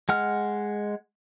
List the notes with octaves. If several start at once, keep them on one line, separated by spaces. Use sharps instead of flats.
G#3 F#5 F6